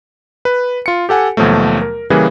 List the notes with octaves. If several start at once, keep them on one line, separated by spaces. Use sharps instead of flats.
B4
F4 C#7
G4 A4 F#5 G#5
D#2 B2 F3 F#3 A3
A#4
C#3 E3 G3 A#3 G#4 B4